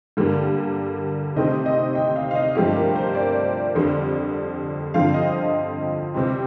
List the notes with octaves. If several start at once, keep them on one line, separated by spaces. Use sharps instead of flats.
G2 D3 G3 A#3
C3 D#3 A3 C4 D#5
D#5
G5
F5
F5
D#5
G2 F3 A3 C4 G4
A#4
C5
D5
F2 D3 G3
G2 D3 F3 C4 F5
D#5
C3 G3 C4